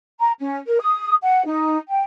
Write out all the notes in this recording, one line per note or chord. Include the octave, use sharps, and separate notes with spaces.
A#5
C#4
A#4
D#6
F#5
D#4
G5